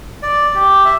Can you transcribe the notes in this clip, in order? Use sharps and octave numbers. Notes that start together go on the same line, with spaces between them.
D5
G4
E5